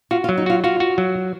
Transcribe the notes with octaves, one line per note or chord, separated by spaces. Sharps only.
F4 F#4
F4
F#3
D#4
F4 F#4
F4 F#4
F#4
F#3